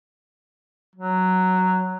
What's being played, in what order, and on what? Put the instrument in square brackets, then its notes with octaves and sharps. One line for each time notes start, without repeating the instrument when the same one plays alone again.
[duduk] F#3